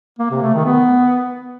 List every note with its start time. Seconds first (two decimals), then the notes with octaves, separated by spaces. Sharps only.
0.19 A#3
0.31 C3
0.42 A3
0.54 D#3
0.66 B3